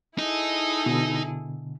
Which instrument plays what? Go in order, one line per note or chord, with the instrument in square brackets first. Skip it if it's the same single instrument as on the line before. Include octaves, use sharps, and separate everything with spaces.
[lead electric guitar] D#4 D#5 [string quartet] E4 G#4 A4
[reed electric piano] B2 D3